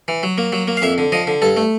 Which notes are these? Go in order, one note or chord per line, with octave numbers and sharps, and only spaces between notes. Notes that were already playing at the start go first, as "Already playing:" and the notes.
E3
F#3
A#3
F#3
A#3
F5
F2 E5
D3
F3 D#5
D3
G2 A4
A3